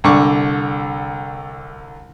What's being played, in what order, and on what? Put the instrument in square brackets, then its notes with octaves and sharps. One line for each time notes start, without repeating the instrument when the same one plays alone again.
[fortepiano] C2 D3 C#6 D6